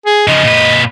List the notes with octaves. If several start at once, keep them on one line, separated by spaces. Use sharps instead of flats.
G#4
C#3 F3 D#5
A#2 B4